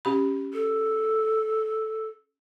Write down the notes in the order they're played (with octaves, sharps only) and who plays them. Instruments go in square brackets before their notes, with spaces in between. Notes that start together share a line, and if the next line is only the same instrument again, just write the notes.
[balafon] C#4 G4 B5
[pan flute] A4